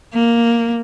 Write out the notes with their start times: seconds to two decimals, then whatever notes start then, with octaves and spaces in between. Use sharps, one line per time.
0.14 A#3